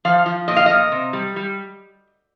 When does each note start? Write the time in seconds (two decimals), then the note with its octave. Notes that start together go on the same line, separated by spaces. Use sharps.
0.05 F3 F5
0.26 F3
0.48 A#2 D#5
0.56 F5
0.66 A#2 D#5
0.92 C3
1.13 G3
1.36 G3